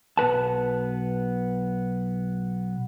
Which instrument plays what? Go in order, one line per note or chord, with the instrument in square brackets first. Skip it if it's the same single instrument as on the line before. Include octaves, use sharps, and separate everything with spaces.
[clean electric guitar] B1 B3 B4 A5